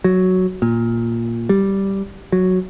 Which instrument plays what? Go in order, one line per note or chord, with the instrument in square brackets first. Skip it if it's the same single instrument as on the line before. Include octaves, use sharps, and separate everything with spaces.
[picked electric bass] F#3
A#2
G3
F#3